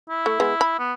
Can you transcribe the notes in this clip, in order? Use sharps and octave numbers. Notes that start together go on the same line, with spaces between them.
E4
A3
G#3 B3
B5
B3